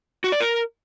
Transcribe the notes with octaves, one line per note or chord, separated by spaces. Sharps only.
F#4
D5
A#4